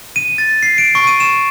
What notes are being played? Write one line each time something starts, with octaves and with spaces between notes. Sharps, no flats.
D#7
A6
C7
D7
C#6
D#7
E7